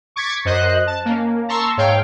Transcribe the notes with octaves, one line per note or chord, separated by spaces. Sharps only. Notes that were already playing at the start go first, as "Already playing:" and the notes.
C#6 D6 G#6 A6 B6 C#7
F#2 C5 D#5 F#6
A5
A#3 C#4
A5 A#5 C6 C#6 E6
G#2 C#5 F5 G5